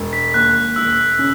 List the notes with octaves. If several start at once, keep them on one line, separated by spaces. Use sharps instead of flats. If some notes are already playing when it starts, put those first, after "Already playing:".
Already playing: E1
B6
D#2 F#6
E1 E6
C#3